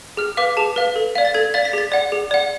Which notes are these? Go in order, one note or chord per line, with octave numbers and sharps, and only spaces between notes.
G#4 F6
B4 F5 D6
G#4 A5
B4 F5
A4
D5 F5
A6
A4 G#6
D5 F5 A6
B6
G#4 A6
D5 F#5
G#4
D5 F#5